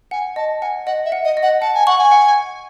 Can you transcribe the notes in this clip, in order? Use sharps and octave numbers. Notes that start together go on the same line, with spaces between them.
F#5 G#5
D#5 A5
F#5 G#5
D#5 F#5
E5
F#5
D#5
D#5
F#5
F#5 A5
G#5
F#5 C#6
G#5
F#5